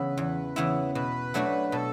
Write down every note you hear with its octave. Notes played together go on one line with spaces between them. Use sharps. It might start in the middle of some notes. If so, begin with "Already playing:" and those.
Already playing: C#3 E3 B3 E4 B4
E2
C#3 E3 B3 E4
B2 B4
F#3 A3 D4 F#4
B2 A4